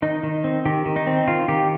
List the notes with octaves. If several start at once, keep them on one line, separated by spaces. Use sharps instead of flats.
D#3 D#4
D#3
C4
D#3 G4
D#3
D#4
C4
D#3 F4
D#3 G4